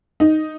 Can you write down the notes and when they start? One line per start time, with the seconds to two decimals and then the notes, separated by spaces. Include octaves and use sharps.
0.20 D#4